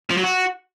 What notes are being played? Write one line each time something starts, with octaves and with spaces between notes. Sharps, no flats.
F3
F#3
F#4